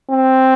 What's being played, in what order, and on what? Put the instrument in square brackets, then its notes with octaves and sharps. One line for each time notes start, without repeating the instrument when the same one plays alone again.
[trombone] C4